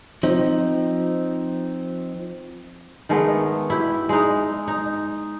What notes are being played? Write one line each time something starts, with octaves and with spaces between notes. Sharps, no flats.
F3 C4 D#4
D#3 G#3 A3 B3
E4 G4
G#3 D#4
D#4